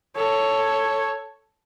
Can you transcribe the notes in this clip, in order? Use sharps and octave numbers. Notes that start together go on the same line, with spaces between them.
A4 C#5